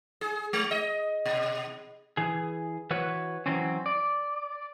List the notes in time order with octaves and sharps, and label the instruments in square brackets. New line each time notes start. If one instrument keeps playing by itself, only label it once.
[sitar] G#4
G#3
D#5
B2
[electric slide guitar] E3 G#4
E3 F#4 B4 C#5
E3 F#3 C4 C#4
D5